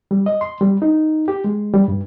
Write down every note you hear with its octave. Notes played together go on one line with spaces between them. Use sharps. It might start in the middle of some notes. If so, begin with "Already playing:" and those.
G3
D#5
C6
G3
D#4
G4
G#3
G3
G2